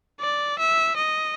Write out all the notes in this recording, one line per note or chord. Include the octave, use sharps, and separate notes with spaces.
D5
E5
D#5